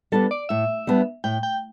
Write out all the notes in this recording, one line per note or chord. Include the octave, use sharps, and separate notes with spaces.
G3 B3 D4 A4
D5
A2 E5
G3 B3 D4
A2 G5
G5